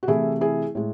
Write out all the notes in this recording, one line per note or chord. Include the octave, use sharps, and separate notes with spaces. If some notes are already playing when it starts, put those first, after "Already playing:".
F#4
C3 E3 A3 E4 G#4
E4 G#4
A2 G#3